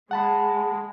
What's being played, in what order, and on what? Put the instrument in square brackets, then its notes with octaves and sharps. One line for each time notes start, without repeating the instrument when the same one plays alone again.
[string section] G#3 [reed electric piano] F#5 A5 B5